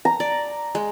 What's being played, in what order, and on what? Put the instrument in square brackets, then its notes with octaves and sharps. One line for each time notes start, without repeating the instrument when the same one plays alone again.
[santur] A#5
[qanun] D5
G#3